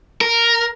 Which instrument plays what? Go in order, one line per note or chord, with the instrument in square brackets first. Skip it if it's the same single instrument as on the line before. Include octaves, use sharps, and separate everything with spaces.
[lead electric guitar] A#4